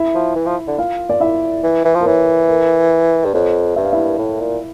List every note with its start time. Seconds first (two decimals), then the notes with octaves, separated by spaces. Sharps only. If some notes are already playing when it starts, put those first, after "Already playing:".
Already playing: E4 E5
0.15 F3
0.35 E3
0.46 F3
0.67 D3
0.78 F4 F5
1.09 D5
1.20 E4 E5
1.63 E3
1.85 E3
1.95 F3
2.01 A#4
2.06 E3 C#5
2.48 A#4
3.25 G2
3.33 F2 C#5
3.76 G2 E5
3.84 F5
3.93 E4 E5
4.19 A2
4.40 A#2